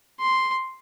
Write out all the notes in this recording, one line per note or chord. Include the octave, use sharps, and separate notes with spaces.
C6